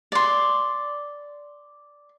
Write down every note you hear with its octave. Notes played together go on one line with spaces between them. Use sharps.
D5 C6